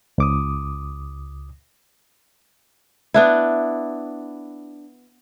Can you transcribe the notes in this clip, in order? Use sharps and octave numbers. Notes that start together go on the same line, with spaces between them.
C#2 D6 D#6
B3 D4 E4